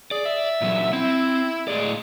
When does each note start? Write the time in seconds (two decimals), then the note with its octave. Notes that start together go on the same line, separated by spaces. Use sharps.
0.11 G#4 D5
0.25 E5
0.61 A#2 F#3
0.93 C4 E4
1.68 A2 G#3 D5